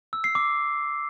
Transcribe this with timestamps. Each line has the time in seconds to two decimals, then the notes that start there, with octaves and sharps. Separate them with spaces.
0.13 E6
0.24 C7
0.35 D6